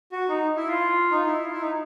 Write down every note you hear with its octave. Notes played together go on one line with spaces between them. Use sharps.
F#4
D#4
E4
F4
D#4
E4
F4
E4
D#4